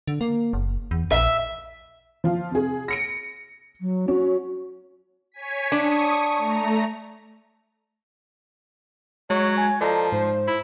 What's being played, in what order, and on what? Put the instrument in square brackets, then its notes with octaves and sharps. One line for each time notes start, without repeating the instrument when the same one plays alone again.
[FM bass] D3
A#3
F#1
E2
[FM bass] A#1 [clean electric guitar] E5
[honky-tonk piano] F3 F4
C3 G#4
A#6 C#7 D7
[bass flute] F#3
[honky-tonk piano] C#4 [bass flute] F#4
[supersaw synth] C#5 G#5 B6
[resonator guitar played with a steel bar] D4 [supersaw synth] C#6 D#6
[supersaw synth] A3 A#5
[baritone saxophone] F#3 [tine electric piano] G#3 [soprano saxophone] C#5
[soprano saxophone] G#5
[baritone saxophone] F3 [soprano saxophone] A4 [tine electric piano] D5 D#5 A#5
[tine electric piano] G#2 [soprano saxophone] C5
[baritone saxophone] E4